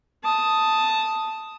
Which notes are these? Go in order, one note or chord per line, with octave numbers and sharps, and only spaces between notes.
A5 D#6